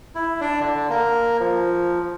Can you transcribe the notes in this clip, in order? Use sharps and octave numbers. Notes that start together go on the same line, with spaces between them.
E4
D4
D3
A#3
F3